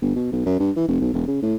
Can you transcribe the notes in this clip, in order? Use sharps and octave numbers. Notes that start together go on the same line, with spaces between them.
G1
B2
B1
F#2
G2
E3
F1
B1
E1
C#3
A2